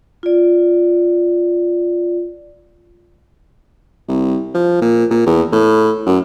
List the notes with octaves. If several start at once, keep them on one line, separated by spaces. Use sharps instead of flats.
F4 D5
C2
F3
A#2
A#2
E2
A2
F#2